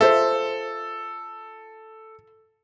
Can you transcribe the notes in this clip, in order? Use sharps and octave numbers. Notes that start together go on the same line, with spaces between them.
F4 A4 C5 E5